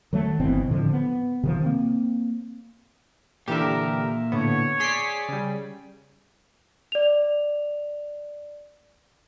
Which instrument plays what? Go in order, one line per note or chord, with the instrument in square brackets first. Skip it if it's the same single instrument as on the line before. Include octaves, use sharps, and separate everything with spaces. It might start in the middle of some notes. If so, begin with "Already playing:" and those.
[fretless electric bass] D#3 F#3 A3
G1 B2 E3 C4
A2 D3 D#3 F3
B3
C3 D#3 F3
A#3 C4
[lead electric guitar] A#2 E5 [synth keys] D3 E3 G4 [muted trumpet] A#4
[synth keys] A2 D3 B3 [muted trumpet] C#5
[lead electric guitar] G#4 D5 [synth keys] C6 B6 C7
[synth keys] C#3 G3
[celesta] D5 F7